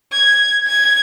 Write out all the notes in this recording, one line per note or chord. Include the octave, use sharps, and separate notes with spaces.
G#6
G#6